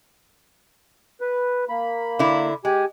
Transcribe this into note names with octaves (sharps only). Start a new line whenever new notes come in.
B4
A#3 B5
D3 E4
G#3 G4 G#5